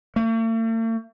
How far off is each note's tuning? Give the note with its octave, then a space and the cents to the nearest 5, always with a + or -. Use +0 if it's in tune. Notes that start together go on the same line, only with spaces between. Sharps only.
A3 +45